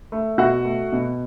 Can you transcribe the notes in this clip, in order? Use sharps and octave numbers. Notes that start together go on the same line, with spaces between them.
A3
B2 F#4 F#5
A3
B2